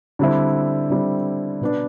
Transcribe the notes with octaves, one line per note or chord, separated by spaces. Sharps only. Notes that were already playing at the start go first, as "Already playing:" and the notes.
D3 G3 C4 E4
D3 G3 C4 E4
B2 B3 D4